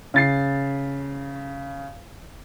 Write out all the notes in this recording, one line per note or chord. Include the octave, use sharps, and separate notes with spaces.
C#3 A6 C7